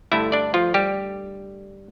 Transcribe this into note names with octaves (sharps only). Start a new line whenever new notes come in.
G2 D3 A3 E4 E5
D4 D5
F3 F4
G3 G4